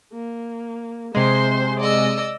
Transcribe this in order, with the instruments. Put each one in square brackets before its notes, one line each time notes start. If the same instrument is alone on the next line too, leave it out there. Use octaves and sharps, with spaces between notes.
[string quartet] A#3
[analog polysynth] C3 G#3 [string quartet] C5 C6
[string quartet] D5 D#5 E6